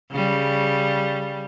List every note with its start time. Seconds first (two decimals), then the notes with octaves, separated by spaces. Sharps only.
0.12 C#3 G3